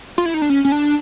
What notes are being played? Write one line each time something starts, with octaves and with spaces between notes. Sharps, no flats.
F4
E4
D#4
D4
C#4
C#4
D4